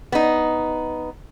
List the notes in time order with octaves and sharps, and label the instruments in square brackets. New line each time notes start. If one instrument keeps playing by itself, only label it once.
[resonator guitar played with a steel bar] B3 D#4